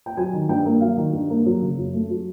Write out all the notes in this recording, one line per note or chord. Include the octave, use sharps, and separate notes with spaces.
G5
F#3 G#5
D#3
G2 G5
A#3
F#3 F5
D#3
G2
A#3
F#3
C#3
F#2
A3
F#3